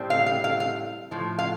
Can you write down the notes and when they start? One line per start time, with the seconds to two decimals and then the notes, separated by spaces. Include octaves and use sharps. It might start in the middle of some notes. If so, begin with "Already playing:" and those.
Already playing: A2 G3 C4
0.10 F5
0.26 F5
0.44 F5
0.60 F5
1.11 A2 F3
1.39 F5